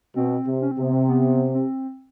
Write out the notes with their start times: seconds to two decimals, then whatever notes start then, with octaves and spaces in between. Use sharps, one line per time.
0.16 B2 C4
0.46 C3
0.62 C#4
0.71 C4
0.77 C3
0.82 B3
0.92 C4
1.09 B3
1.54 C4